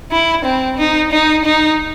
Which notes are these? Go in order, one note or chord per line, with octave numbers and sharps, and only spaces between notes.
E4
C4
D#4
D#4
D#4